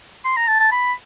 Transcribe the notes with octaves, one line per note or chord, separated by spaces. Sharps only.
C6
A#5
A5
A5
B5